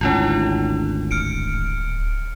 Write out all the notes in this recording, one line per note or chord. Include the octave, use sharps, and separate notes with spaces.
G#1 D2 C#4 D4 E4 F4
D1 F6 C#7 D7